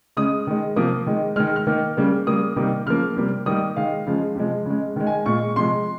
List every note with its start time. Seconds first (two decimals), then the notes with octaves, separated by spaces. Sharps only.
0.17 C#3 G#3 D#6
0.47 D#3 G#3
0.76 C3 F3 A#3 D#6
1.07 D#3 G#3
1.36 D#3 G#3 F6
1.56 F6
1.67 D#3 A#3
1.97 C#3 G3 A#3
2.27 C#3 G3 A#3 D#6
2.56 C3 D#3 G3 A#3
2.86 C#3 F3 A#3 F6
3.17 C3 G3 A#3
3.46 D#3 G3 A#3 D#6
3.76 D#3 G#3 F5
4.06 C#3 F3 G#3
4.36 C3 F3 G#3
4.66 C#3 G#3
4.96 D#3 G#3
5.07 G#5
5.26 A#2 G#3 C#6
5.56 C3 F3 G#3 C6